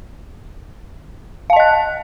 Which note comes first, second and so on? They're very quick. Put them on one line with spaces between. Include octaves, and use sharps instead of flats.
F5 A5 D#5 F#6